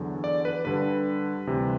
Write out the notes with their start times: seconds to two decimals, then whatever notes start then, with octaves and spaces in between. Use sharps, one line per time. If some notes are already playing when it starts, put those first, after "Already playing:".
Already playing: E2 D3 F#3
0.24 D5
0.45 B4
0.65 G2 D3 G3 B4
1.47 D2 C3 E3 G3